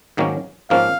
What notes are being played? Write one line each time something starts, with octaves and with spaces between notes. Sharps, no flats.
G#2 D#3 F#3 A#3 C#4
G#2 F3 A#3 C#4 F5